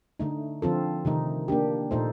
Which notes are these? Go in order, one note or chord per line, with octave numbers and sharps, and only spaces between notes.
D3 A3 D#4
D3 F3 C4 F4 A4
C3 D#3 A3 D#4
A#3 D4 G4
A#2 A3 D#4 A4 C5